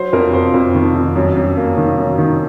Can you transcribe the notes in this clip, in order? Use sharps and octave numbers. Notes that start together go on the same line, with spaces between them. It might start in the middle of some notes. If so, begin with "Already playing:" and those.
Already playing: F#3 C5
F2 A#4
F2 C5
F2
D#3
F2
F#2
F#2
A#3
D#3
F#2
D#3